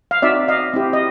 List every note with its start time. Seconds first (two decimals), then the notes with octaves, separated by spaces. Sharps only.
0.11 F5
0.22 C4 D#4 F#4 D5 E5
0.48 D#5 F5
0.74 C4 E4 G4
0.93 D#5